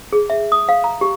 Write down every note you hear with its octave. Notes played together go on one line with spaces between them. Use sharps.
G#4
E5
D#6
F5
A#5
G4